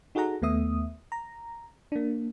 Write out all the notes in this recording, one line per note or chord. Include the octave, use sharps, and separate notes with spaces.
D#4 F#4 G#4 A4 F#5 A#5
D#2 A3 B3 E5 D#6
A#5
A#3 D4